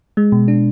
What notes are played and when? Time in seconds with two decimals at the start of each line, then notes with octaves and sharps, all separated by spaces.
0.17 G#3
0.32 B2
0.48 D4